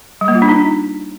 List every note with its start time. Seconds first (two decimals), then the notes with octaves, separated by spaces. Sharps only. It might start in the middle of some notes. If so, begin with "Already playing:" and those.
0.21 G3
0.28 A#3
0.35 F4
0.42 D4
0.49 D#4